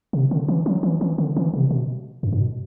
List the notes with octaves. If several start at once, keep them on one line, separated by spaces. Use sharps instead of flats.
C3
D3
E3
F#3
E3
E3
D3
E3
C3
B2
F#2
G2
B2